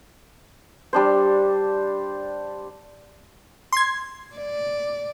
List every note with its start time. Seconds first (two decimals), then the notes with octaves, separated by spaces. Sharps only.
0.93 G3 D4 C5
3.73 C6 G#6
4.36 D5